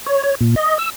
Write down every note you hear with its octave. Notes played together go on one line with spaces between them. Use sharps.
C#5
C#5
A#2
D#5
E6